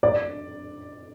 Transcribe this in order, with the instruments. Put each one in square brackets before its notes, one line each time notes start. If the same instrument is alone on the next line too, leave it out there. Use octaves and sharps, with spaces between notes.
[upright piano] D5